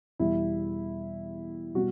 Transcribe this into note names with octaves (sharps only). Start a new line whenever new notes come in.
E2 B2 G3 E4
B2 G3 F#4